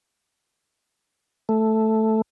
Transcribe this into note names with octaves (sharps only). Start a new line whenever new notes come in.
A3